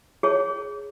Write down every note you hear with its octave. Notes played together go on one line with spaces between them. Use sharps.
G#4 C#5